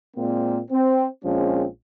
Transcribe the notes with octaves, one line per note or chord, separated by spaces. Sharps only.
A#2 G#3 A#3 C4
C4
A#1 F3 G#3 C4 C#4